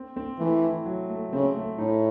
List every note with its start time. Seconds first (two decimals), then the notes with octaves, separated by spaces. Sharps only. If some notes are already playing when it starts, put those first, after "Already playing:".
Already playing: C4
0.16 C4
0.39 E3 A3
0.63 E4
0.85 F#3
1.09 A3
1.33 C#3 C4
1.56 A3
1.78 A2 D#4